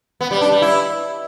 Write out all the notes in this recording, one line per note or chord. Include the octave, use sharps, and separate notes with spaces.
B3
G3
D4
G3
E4